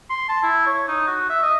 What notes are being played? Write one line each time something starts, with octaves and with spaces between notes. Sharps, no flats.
C6
A5
E4
C#5
D#4
F#4
E5
D#5